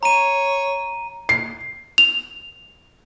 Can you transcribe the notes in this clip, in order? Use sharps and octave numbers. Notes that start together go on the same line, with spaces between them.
C#5 A#5 D#7
C7
F7